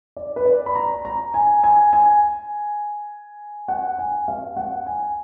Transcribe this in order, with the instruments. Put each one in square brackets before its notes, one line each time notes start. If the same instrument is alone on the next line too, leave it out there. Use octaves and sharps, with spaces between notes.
[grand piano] D5
B4
D5
B5
A#5
A#5
G#5
G#5
G#5
F#5
G#5
F5
F#5
G#5